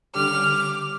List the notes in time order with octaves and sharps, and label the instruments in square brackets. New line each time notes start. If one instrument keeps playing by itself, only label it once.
[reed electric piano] D3 G3 G4 [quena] D6 [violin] F6